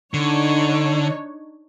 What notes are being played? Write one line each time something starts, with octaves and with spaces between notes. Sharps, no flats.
D3 D4 D#4 C#5